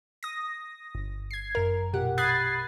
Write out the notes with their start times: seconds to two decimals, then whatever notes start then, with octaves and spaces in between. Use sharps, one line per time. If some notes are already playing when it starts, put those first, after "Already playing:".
0.23 D#6 A#6
0.95 G1
1.31 G#6 C7
1.55 F#2 A#4
1.93 A#1 B2 G4 F#5
2.18 B5 D#6 F#6 G#6 A6 C7